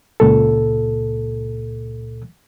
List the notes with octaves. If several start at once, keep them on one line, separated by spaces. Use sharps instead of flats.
C#2 A#2 A4